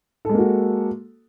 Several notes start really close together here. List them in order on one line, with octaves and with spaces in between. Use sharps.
A4 G#3 A#3 F#4